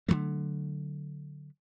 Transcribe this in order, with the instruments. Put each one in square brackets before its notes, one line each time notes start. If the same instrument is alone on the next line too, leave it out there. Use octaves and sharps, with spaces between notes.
[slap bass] D3 F3 F#3 A3